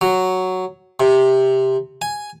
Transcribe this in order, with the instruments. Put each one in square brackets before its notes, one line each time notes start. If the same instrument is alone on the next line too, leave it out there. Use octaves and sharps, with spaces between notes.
[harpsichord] F#3
C3
G#5